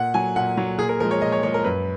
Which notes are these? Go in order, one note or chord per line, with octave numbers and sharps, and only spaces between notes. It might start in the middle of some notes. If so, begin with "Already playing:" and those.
Already playing: A#2 F#5
F#3 G#5
A#2 F#5
F#3
A#2 G#4
A#4
F3 G#3 A#4
C#5
A#2 D#5
C#5
F3 G#3 C#5
A#4
F#2 B4